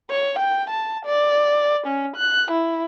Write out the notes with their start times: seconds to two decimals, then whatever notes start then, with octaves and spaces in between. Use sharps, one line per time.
0.10 C#5
0.39 G5
0.70 A5
1.06 D5
1.87 C#4
2.17 F#6
2.52 E4